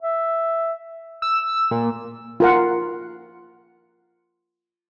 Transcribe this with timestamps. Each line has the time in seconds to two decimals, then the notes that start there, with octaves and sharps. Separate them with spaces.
0.02 E5
1.22 E6
1.71 A#2
2.40 F4 A#4 F#5